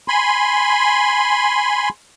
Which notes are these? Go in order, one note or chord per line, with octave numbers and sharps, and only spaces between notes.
G#5 B5 C6